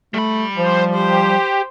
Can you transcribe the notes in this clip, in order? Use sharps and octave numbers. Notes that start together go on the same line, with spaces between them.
G3 A3 B5
F3 C5
G4 C5